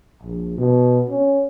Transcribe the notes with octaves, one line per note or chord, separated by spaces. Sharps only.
A#1
B2
C#4